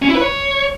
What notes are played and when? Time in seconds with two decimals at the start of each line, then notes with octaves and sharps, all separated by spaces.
0.02 C#4
0.09 E4
0.15 B4
0.21 C#5